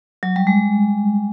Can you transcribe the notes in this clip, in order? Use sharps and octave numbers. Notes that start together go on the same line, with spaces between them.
F#3
G3
G#3